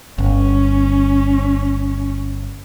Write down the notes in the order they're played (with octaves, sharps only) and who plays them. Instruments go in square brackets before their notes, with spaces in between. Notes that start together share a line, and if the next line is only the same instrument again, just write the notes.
[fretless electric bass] G1 [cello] C#4